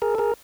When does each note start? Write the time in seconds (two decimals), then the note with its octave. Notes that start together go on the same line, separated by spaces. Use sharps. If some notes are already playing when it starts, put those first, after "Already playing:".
0.02 G#4 A#4
0.15 A4
0.18 G#4 A#4